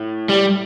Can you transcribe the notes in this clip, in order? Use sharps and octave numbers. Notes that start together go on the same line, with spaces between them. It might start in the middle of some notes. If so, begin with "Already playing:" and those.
Already playing: A2 A3 E4
G3